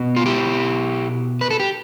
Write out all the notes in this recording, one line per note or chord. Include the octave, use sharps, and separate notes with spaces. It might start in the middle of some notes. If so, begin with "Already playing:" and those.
Already playing: B2 B3
F4
E4 G4
B4
A4
G4